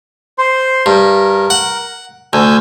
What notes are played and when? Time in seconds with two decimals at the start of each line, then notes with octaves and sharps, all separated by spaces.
0.38 C5 C6
0.86 G2 A#4
1.50 F#5
2.33 D2 G#5 E6 G6